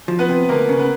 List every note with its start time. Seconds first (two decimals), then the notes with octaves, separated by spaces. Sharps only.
0.08 F3
0.19 B3 B4
0.29 C3
0.49 D2 A#3 A#4
0.69 C#3
0.79 B3 B4